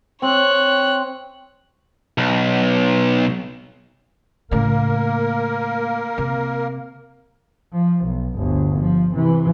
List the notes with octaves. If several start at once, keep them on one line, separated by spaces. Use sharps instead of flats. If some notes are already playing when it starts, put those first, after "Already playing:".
C4 C#5 F#6
B1
A2 C#3 A#3 A#4
C3
F3
B1
G1 D2
F3
C3 E3